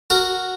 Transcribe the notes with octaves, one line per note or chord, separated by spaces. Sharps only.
F#4 A#4